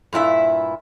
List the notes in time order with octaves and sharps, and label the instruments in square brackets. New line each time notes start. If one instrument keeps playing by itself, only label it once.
[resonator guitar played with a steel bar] G2 A#2 E4 E5